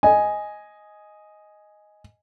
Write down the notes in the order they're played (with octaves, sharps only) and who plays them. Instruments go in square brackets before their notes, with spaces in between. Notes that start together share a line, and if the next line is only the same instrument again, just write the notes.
[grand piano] D#5 G#5